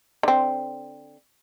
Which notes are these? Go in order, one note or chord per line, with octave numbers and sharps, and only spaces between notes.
D3 C4